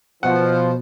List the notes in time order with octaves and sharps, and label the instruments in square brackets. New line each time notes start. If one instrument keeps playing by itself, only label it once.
[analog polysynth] B2 [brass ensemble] F3 [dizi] C5 [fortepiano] F#5